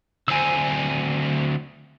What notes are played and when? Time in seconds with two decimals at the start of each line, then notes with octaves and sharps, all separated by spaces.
0.28 D2 C4 G#5 E6